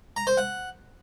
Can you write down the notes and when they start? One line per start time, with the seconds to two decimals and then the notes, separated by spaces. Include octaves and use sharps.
0.16 A#5
0.27 C5
0.37 F#5